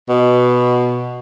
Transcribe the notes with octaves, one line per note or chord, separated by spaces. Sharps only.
B2